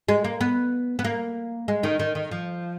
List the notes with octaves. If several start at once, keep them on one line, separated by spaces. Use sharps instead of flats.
G#3
A#3
B3
B3
A#3
G#3
D#3
D#3
D#3
F3